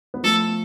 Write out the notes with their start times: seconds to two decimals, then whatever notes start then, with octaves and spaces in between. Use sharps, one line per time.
0.14 B3
0.23 F3 A3 A4